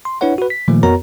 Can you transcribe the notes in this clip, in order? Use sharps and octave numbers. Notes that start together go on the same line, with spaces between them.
C6
D4 E4 B4 C#5 F#5
F#4 B4
B6
A#2 D#3 F3 A3 A#3
F2 B3 F#4 A#4 C#5 A#5